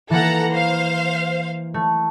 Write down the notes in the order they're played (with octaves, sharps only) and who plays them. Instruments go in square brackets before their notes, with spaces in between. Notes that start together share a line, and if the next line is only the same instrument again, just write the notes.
[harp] E3 A#3 [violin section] A4 F#5 A#5
[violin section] C5 F5
[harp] A3